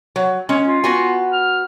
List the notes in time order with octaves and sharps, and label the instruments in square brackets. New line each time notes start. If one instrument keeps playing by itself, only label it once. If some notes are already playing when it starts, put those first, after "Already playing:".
[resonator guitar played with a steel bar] F#3
G#3 C#4
[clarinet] F4
[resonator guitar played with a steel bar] B3 F#4 G#5
[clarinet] F6